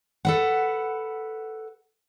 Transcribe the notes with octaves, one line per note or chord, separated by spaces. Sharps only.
A4 B4 F#5